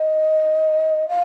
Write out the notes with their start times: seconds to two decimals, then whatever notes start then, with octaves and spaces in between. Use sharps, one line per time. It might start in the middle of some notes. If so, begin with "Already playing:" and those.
Already playing: D#5
1.09 F5